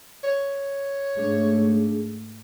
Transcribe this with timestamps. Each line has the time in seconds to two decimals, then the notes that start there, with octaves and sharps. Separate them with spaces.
0.24 C#5
1.17 G#2 A3 D4 G#4